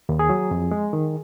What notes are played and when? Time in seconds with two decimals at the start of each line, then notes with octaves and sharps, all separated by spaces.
0.09 D#2
0.19 G#4
0.29 F#3
0.51 F2
0.71 G#3
0.93 D#3